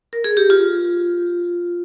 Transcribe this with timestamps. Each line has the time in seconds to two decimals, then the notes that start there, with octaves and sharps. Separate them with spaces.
0.13 A#4
0.24 G#4
0.37 G4
0.50 F4